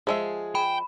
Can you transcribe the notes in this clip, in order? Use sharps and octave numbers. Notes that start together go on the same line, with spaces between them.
F3 G#3 G#4 E5
G5 B5